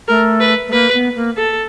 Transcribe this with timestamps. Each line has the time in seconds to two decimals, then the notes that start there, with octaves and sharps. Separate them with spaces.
0.08 A3 A#4
0.40 B4
0.68 A3
0.72 A#3 B4
0.94 B3
1.16 A#3
1.37 A4